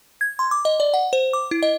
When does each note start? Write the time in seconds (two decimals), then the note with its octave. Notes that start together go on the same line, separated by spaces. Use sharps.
0.21 G#6
0.39 C6
0.51 D6
0.65 D#5
0.80 D5
0.94 F#5
1.13 C5
1.33 D6
1.51 E4
1.63 D#5